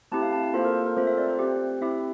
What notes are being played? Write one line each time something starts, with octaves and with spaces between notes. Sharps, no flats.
A3 C4 E4 G4 A5
F5
A5
A5
A#3 F4 A4 C5
A#4
A#4
A3 C4 F4 A4 C5
E5
D5
C5
C4 G4
C4 E4 G4 E5